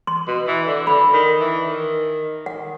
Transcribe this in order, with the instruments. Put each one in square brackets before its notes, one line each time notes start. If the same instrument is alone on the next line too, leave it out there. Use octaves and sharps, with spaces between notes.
[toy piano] C6
[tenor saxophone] B2
E3
D3
[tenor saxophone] D3 [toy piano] B5
[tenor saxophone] D#3
E3
D#3
[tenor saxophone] D#3 [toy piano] F#5